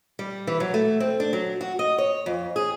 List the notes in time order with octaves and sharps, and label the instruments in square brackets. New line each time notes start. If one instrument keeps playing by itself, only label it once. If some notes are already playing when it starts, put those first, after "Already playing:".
[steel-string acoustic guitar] G3
E3
F#3
A3
C4
D4
F#3
F#4
D#5
C#5
F2
G#4